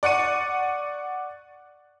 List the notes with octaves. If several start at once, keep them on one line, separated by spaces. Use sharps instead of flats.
D5 F#5 C#6 C#7 D#7